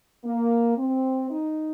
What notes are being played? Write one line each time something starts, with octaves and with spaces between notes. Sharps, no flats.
A#3
C4
D#4